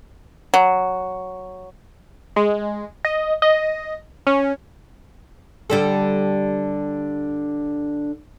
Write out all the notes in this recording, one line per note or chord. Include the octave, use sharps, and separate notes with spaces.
F#3
G#3
D#5
D#5
C#4
D3 G3 A4